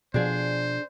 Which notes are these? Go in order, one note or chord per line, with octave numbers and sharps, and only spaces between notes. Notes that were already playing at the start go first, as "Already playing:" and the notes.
B2 F3 D4 G#4 C5